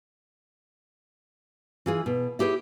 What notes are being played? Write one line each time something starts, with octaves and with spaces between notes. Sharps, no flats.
E3 F4 G#4
B2
E4 G4 G#4 C5 C#5